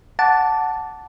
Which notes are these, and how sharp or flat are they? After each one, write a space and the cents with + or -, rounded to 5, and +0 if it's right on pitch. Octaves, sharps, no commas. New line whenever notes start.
F#5 +0 A5 +0 D6 -10